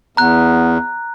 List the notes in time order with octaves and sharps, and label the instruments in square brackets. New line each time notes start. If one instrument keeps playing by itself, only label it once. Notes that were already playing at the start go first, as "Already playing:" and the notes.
[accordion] E2 [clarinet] B3 [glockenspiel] A#5 F#6